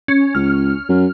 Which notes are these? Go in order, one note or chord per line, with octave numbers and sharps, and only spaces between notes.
C#4
C#2 F6
F#2